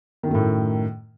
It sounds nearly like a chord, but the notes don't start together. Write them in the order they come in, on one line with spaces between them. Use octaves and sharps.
D#3 F#2 A3 A2